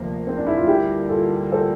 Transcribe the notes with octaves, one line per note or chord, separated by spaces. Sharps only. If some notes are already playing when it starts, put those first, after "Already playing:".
Already playing: D2 C3 F3 A#3
C4
D4
E4
F4
D2 D3 G3 A#3 E4 G4
F4 A4
A4 C5